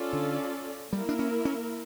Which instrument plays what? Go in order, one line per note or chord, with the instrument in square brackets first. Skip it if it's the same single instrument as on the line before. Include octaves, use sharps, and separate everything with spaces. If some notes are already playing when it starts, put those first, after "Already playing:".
Already playing: [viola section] C#4 F4 A4 D5
[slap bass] D3
[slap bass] G3 [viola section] A#3 E4 A#4
[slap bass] D4
C#4
C#4